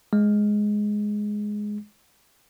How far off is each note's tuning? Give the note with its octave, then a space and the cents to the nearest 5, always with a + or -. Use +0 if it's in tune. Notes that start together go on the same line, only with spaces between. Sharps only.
G#3 +5